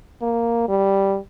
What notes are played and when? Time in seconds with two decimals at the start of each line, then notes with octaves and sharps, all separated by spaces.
0.22 A#3
0.69 G3